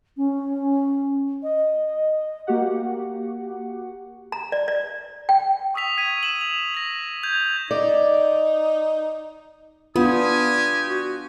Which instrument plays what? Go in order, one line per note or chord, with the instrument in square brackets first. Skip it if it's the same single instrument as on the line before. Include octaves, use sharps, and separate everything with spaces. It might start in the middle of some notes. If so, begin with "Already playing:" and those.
[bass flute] C#4
D#5
[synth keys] A#3 F#4 G4 F#5
[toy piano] A#5
D5
D5
G5
[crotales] C#6 D#6 E6 B6 F7
G#6 B6 D#7
E7 F#7
F7
A#6 B6
G6 G#6 F7
[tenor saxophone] D#4 [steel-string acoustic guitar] D5
[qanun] B3 [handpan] D4 F4 [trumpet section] G4 G#5 [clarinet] D#6
[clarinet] F#4